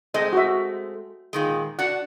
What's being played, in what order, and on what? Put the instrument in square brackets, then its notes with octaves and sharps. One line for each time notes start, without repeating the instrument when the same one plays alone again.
[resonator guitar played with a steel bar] G#3 A3 C4 [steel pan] D#5
[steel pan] F#4 E5
[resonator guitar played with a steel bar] A#2 D#3 G#3
[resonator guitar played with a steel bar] D4 F#4 [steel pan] F#5